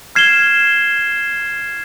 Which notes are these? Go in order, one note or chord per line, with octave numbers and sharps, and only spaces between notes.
F6 G#6 C7 E7 G7